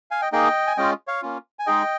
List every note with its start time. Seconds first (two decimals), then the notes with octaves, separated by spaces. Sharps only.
0.11 F5 G#5
0.22 D#5 G5
0.32 A#3 D#4 G#4 D#5 G5
0.67 G#5
0.77 G#3 C#4 F4 D#5 G5
1.08 C#5 F5
1.22 A#3 C#4 F4
1.59 G#5
1.67 G#3 D#4 G#4 D#5 G5